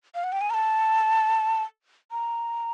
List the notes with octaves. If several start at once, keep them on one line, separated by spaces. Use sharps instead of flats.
F5
F#5
G5
G#5
A#5
A5
A#5